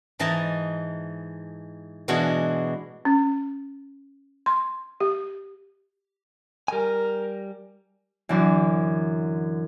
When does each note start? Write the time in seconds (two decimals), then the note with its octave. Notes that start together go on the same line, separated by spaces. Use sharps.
0.19 G#2 E3 D#5 A5 A#5
2.08 B2 E3 G#3 D4 F#4
3.05 C#4
4.46 C6
5.00 G4
6.68 G3 A#4 G#5
8.29 F#2 D3 E3